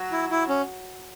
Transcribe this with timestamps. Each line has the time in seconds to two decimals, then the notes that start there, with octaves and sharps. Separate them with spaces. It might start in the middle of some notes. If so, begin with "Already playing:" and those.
Already playing: F#3
0.12 E4
0.31 E4
0.49 C#4